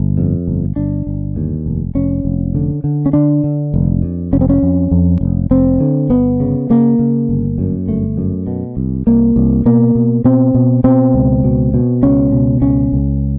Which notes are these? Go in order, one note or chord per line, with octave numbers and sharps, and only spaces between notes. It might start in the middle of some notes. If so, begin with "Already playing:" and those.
Already playing: G1
F2
G1
G1 D4
G1
D#2
F1
F1 C#4
F1
D3
D3
C#4
D3 D4
D3
F1
F2
F1 C#4
C4
C#4
F2
F2
F1
F1 C4
D3
G1 B3
C#3
C#3 A#3
C#3
G1
F#2
G1 A3
F#2
B2
C2
C2 A#3
C2
B2 A#3
B2
B2 C4
B2
B2 C4
C#2
B2
B2
C#2 C#4
B2
C#2 C#4
C#2